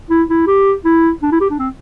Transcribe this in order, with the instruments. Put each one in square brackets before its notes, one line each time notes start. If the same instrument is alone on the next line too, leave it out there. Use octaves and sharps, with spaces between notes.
[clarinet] E4
E4
G4
E4
D4
E4
G4
D4
C4